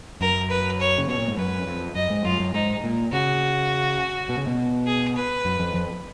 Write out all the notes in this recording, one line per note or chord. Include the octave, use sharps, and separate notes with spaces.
F#2 A#4
B4
C#5
C#3
B2 C#5
A#2
G#2
F#2 B4
F2
F#2 D#5
G#2
F#2 F4
F#2
G#2 D#4
A#2
C#3 F#4
B2
C#3
B2
G#4
B4
F#2
F2
F2